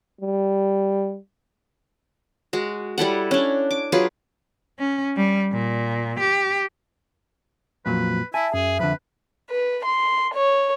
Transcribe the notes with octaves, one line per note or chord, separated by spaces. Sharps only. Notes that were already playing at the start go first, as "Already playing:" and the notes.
G3
G#3 F#4
G3 E4 A4 F#5
C#4 D4
D6
F#3 F4 G#4 B4
C#4
G3
A#2
G4
F2 A#2 F#3 B4
E4 E5 G#5 A5
F#2 G#4
F2 D3 B4 F#6
B4
C6
C#5